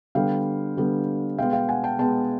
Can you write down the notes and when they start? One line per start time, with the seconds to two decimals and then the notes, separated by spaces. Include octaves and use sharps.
0.15 D3 G3 B3 F5 G5
0.77 D3 G3 B3
1.38 B2 G#3 B3 F5 G5
1.53 F5 G5
1.69 F#5 G#5
1.84 G5 A5
1.99 B2 G#3 B3 G5 A5